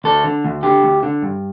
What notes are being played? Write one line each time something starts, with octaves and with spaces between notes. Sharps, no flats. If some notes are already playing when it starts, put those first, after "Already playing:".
D2 A4
D3
D2
D3 G4
D2
D3
G2